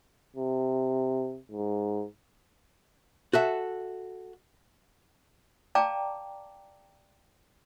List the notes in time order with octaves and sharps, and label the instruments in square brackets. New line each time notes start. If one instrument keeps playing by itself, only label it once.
[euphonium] C3
G#2
[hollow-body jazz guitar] F#4 A4 E5
[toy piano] D5 F5 G5 A5 A#5 D6